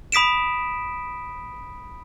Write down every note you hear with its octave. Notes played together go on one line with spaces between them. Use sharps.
B5 D#6 B6 D7 E7